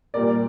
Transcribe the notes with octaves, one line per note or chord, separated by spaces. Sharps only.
A#2 G3 A#3 A#4 D5